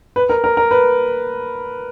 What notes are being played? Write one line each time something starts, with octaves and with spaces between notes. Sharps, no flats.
B4
A#4
A#4
A#4
B4